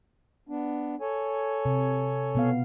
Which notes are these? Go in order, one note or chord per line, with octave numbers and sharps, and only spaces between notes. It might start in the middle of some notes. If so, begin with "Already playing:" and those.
B3 D4
A4 C#5 G#5
C3
B2 B3 F5